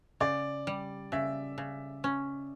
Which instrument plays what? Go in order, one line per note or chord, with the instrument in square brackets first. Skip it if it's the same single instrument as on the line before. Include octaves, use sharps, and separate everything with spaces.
[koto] C#3 [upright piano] D5
[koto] G3
[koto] C#3 [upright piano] E5
[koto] C#3
C#4